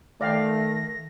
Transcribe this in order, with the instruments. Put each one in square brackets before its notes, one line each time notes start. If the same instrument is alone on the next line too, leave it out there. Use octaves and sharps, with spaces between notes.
[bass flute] D#3 [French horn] A3 [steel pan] D5 F5 G5 [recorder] A#6